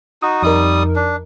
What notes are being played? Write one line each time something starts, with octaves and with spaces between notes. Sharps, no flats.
D#4 F#4 D#6
F2 G3 D#4 A#4 D#6
D4